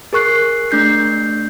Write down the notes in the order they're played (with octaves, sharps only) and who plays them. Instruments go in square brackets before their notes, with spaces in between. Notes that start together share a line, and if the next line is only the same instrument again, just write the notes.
[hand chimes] G#4 A#4 C#6 F#6 C7
A3 D4 G6 C7